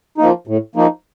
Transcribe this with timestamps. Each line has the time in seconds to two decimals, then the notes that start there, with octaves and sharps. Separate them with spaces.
0.18 F3 A#3 D#4
0.47 A2
0.75 F3 A#3 D#4